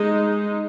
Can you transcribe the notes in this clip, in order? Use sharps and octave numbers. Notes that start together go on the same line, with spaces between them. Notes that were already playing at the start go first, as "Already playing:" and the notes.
Already playing: G#3 D#4